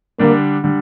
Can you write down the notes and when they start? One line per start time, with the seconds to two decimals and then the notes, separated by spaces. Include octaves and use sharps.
0.19 D3 G3 A#3 D4
0.64 D3 G3